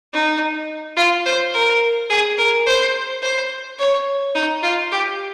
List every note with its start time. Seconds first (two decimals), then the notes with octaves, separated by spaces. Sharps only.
0.13 D#4
0.97 F4
1.25 C5
1.54 A#4
2.10 G#4
2.38 A#4
2.66 C5
3.22 C5
3.79 C#5
4.35 D#4
4.62 F4
4.92 G4